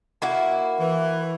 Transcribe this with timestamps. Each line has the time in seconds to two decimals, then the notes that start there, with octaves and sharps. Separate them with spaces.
0.22 A#3 E4 F#4
0.79 E3